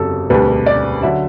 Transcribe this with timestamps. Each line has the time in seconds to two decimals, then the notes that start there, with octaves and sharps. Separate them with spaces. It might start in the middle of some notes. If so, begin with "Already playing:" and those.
Already playing: F#1 E2 C3 F#3 A4
0.30 E1 D2 C3 G3 D4 B4
0.66 D5
1.03 D3 F#3 E5